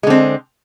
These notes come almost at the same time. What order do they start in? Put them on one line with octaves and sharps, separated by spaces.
G#3 D3 C4